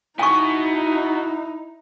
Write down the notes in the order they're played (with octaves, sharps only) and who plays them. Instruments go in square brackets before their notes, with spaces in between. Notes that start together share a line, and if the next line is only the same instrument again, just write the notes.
[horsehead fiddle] D#4 [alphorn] E4 [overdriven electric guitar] F#4 D#5 [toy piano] G#5 C#6